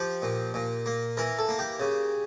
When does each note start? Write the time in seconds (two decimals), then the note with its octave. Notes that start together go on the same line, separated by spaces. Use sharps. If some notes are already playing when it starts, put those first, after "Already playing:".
Already playing: F3 G4
0.22 A#2
0.54 A#2
0.86 A#3
1.17 E3 A#4
1.39 A4
1.49 A#3
1.59 G4
1.80 C#3